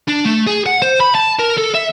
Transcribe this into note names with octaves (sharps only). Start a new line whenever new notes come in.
D4
A3
G#4
F#5
C5
B5
A5
A#4
A4
E5